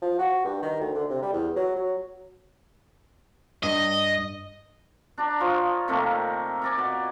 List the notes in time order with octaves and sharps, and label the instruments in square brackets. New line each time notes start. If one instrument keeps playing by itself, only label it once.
[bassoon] F3
F#4
G2
D#3
D2
D3
C3
G3
E2
F#3
F#3
[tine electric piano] G2 [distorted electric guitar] D#5
[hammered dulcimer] D4 D5 A#5
F3 F4 C#5 D#5
C3 D#3 A3 A#3
A#4 D5 G#5
B2